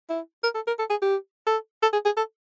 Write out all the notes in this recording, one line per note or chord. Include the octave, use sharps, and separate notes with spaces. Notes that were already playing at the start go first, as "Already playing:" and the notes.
E4
A#4
A4
A#4
A4
G#4
G4
A4
A4
G#4
G#4
A4